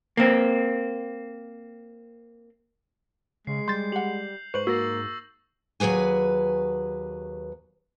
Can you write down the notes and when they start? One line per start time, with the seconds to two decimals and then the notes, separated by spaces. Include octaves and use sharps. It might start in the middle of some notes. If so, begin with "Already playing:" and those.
0.17 A#3 C4
3.47 C#3 G#3 C7
3.68 G3 C6 G6 A6
3.92 G4 F#5 F7 F#7
4.54 G#2 B4 C5 C#6 F#7
4.67 A#3 F#4 E6 A6 A#6
5.80 D#2 F#3 G#4 B4 G#5